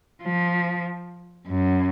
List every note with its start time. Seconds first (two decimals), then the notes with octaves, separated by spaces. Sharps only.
0.22 F3
1.48 F#2